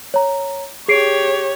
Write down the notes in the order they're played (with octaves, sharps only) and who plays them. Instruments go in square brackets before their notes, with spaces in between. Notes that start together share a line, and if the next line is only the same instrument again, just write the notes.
[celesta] C#5 A#5
[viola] G4 C#5 [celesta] G#4 C7 D7